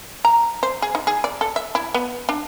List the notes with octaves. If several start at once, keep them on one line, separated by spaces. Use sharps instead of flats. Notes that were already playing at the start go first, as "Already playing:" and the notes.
A#5
C5
G#4
D#4
G#4
D5
A4
E5
E4
B3
D4